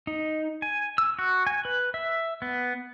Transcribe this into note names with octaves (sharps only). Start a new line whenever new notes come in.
D#4
G#5
E6
F#4
G#5
B4
E5
B3